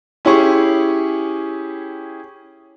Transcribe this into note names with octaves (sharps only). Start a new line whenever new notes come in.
C#4 E4 G4 G#4 C#6